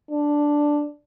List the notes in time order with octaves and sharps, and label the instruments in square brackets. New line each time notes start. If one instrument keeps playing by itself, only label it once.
[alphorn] D4